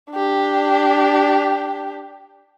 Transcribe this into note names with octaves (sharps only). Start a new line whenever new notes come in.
D4 G4